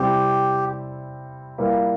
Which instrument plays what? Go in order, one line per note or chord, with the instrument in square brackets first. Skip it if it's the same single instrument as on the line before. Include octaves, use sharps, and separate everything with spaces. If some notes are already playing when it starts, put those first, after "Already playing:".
Already playing: [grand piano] C3 G3 C4 E4 [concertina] G4
[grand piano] A#2 G3 A#3 E4